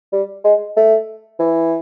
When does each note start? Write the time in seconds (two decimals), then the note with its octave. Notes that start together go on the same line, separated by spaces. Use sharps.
0.12 G3
0.44 G#3
0.77 A3
1.39 E3